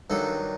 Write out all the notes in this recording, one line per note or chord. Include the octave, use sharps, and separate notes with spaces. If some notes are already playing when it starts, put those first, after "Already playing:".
G2 D#3 F#3 A4